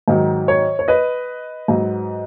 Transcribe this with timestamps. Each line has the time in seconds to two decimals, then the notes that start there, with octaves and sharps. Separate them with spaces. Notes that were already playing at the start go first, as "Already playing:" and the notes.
0.08 G#2 D#3 F#3
0.48 C#5
0.79 C#5
0.88 B4 D#5
1.68 G#2 F#3